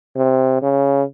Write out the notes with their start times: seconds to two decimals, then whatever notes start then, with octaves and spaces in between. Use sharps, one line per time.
0.16 C3
0.62 C#3